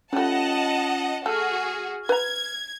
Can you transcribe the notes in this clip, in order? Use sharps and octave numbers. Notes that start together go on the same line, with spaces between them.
G3 A3 C#4 F4 D#5 F#5 A5
A3 F#4 G#4 A4 F6
B4 A#5 G#6